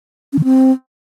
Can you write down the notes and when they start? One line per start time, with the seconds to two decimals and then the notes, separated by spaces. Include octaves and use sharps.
0.33 C#4
0.39 D#3
0.44 C4